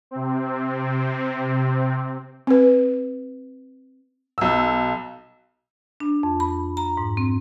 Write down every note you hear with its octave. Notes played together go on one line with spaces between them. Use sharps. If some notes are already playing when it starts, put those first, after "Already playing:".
C3 C4
C4 B4
B1 E6
D4
F2
B5
A#5
G#2
C4